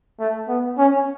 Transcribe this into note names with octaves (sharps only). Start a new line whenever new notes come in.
A3
B3
C#4